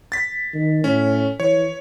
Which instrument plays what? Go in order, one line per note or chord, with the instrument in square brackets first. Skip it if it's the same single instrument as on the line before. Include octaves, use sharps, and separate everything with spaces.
[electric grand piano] A6 B6
[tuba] D#3
[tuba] A2 [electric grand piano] C#4
[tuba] E3 [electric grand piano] C#5